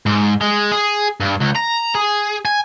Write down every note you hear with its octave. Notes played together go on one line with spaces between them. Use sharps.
G#2
G#3
G#4
G2
C#2
A#5
G#4
G#5